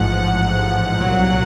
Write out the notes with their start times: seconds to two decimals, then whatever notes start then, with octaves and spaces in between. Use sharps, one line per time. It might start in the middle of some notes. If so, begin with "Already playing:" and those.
Already playing: A1 G#2 F3 F#5
0.99 C2 A#2 F#3